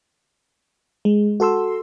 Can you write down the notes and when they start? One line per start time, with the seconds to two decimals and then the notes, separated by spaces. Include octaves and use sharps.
1.05 G#3
1.40 F#4 A4 C6 E6